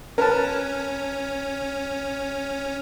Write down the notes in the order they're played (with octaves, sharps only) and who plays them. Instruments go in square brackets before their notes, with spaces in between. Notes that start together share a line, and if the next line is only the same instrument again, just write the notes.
[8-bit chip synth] C#4 [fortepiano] A#4 B4 A5